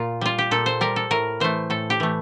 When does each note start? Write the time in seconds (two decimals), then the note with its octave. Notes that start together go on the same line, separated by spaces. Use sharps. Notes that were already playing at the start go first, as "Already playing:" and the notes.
Already playing: A#2 F4
0.21 G3 F4
0.38 G4
0.51 A#2 A4
0.66 C5
0.81 G3 A#4
0.96 A4
1.11 A2 A#4
1.40 E3 A3 C5
1.70 A2 A4
1.90 G4
2.00 E3 A3